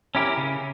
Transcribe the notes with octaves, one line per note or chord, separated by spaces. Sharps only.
C#4 E4 G4 A#4
C#3